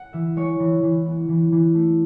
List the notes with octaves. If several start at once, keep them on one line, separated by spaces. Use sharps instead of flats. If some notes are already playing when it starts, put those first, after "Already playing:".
Already playing: F#5
E3 E5
G#3 C#5
E3
E3
B3
E3
E3
A3